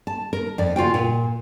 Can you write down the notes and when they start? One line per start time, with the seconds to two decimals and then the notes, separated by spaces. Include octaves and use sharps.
0.07 A5
0.33 A#4
0.58 F2 D5
0.76 C#3 F4 F#4 G5
0.94 A#2